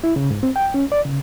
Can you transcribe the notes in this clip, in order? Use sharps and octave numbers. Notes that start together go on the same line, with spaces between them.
E4
C#3
G#2
C4
G5
C#4
D5
C#3